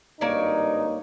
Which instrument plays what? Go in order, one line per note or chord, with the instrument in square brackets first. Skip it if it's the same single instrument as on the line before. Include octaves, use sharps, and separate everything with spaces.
[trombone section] G#1 G2 D#4 [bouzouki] A#3 C#5 D5